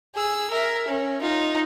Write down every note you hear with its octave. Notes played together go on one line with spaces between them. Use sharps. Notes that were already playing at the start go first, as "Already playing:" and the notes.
G#4 E6
A#4 E5
C#4
D#4 F4